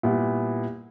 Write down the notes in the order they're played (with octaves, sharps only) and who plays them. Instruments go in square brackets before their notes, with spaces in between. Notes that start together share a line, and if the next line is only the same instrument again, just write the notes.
[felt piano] A#2 G3 B3 E4